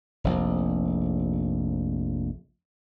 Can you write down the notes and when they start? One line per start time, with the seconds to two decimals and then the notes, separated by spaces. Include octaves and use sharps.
0.24 F1 A#1